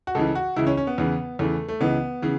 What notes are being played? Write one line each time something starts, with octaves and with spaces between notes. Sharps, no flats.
F#4
C#2 C#3 E3 A4
F#4
C#2 C#3 E3 E4
C#4
C#4
B3
E2 C#3 E3
E2 C#3 E3 A3
A3
C#2 C#3 E3 B3
C#3 E3